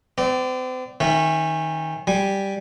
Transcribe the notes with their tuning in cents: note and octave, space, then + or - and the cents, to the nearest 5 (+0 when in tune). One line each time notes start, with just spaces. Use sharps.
C4 -40 D5 +0
D#3 +10 C#4 -25 E5 +0
G3 +0 G#5 +0